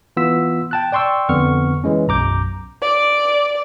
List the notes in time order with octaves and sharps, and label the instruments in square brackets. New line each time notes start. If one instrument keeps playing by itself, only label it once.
[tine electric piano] E3 B3 F4 E6 B6
G5 A5 F#6
D5 G5 C6 C#6 E6
F2 D3 B3 C#6 F6
E3 G#3 C#4
B1 F#2 A#5 D6 G6
[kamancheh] D5